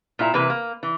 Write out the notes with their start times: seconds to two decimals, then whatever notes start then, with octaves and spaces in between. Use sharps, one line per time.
0.19 A#2 E4 E5 A#5
0.34 C3 E3 A#3 E4 B4
0.50 A#3
0.83 E3